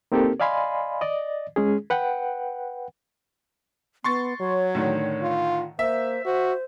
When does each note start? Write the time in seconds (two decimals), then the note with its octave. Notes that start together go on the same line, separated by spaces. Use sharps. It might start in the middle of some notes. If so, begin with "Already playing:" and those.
0.12 A#3 C4 D#4 G4 A4 A#4
0.40 D5 D#5 F5 G#5 B5 C6
1.01 D5 D#5
1.56 G#3 C#4 G#4
1.90 B4 F#5 G5
4.04 B3 C6 C#6 A6
4.40 F#3 C#5
4.75 A2 D3 D#3
5.22 F4
5.79 A#3 C5 E5
6.25 F#4 C5